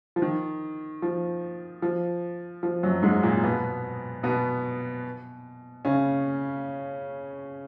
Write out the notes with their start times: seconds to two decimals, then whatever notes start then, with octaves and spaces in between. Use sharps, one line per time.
0.16 F3
0.22 D#3
1.02 F3
1.82 F3
2.63 F3
2.83 F#2 F#3
3.03 G#2 G#3
3.23 A#2 A#3
3.43 B2 B3
4.23 B2 B3
5.85 C#3 C#4